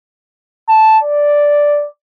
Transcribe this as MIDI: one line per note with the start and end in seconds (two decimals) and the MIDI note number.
0.68 0.98 81
1.03 1.87 74